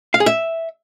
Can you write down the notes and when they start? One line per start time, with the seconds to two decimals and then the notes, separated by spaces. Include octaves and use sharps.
0.14 F5
0.20 G#4
0.26 E5